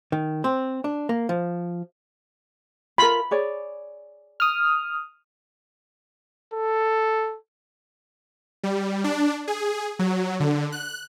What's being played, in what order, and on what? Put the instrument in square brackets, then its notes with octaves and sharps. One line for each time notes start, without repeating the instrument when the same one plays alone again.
[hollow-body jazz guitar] D#3
C4
D4
A#3
F3
[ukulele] F4 A#4 [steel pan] B5
[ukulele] G#4 C#5 D5
[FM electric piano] D#6 F6
[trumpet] A4
[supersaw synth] G3
D4
G#4
F#3
D3
F#6